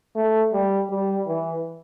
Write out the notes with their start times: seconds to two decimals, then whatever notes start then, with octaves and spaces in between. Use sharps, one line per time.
0.16 A3
0.53 G3
0.90 G3
1.27 E3